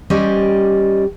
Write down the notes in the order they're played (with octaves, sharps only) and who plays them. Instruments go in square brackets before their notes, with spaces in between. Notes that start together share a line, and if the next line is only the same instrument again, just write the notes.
[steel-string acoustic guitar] G3 C#4 G4 C5 D5 D#5